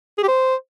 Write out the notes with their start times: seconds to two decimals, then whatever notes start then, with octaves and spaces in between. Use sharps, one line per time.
0.18 G#4
0.23 G4
0.28 C5